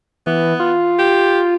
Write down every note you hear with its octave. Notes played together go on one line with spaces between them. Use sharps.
E3 B3
F4
G4